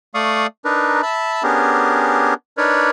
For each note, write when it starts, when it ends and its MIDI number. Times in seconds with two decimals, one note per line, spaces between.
0.15 0.47 57
0.15 0.47 74
0.15 0.47 77
0.15 0.47 85
0.15 0.47 87
0.65 1.01 62
0.65 1.01 63
0.65 1.01 70
0.65 1.01 71
1.03 1.43 76
1.03 1.43 81
1.03 1.43 83
1.43 2.34 59
1.43 2.34 61
1.43 2.34 62
1.43 2.34 67
1.43 2.34 68
1.43 2.34 70
2.58 2.91 62
2.58 2.91 63
2.58 2.91 70
2.58 2.91 71
2.58 2.91 73
2.58 2.91 74